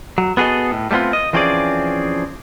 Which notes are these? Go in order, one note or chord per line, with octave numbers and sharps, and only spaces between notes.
F#3
B3 F#4 G#4 A4 D#5
A2
G3 A3 B3 C4 F4
D#5
E3 F3 C4 C#4 G#4 D5